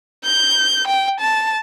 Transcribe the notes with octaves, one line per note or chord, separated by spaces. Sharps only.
G6
G5
A5